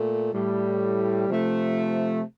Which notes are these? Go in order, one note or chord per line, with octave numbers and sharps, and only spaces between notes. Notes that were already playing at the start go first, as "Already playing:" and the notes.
Already playing: A#2 A3
A2 G3
C3 F3 A3